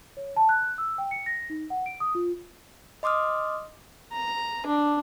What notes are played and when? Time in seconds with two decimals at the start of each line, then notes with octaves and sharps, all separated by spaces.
0.17 C#5
0.37 A5
0.49 F#6
0.78 E6
0.98 G5
1.11 C#7
1.26 A#6
1.50 D#4
1.70 F#5
1.86 D7
2.00 D#6
2.15 F4
3.03 D#5 C6 D6 D#6 F6
4.13 A#5
4.66 D4